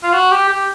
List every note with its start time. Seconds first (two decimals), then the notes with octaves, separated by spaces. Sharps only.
0.03 F4
0.13 F#4
0.31 G4
0.49 G4